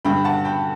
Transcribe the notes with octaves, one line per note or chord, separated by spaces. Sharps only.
G2 D3 G5 B5
F#5 A5
G5 B5